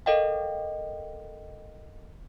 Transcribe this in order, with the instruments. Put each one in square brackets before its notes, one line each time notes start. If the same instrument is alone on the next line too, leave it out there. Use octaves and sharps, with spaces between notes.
[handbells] A4 A#4 D#5 F5 G5